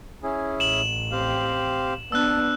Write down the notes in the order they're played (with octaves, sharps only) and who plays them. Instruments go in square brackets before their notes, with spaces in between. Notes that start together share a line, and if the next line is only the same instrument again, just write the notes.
[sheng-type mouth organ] C#4 E4 G#4
[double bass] A1 [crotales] E7 F#7
[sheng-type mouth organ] C4 G4 F5
[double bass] B3 D4 [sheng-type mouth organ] A5 [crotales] E6 F#6